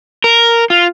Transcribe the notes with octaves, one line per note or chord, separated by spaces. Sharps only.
A#4
F4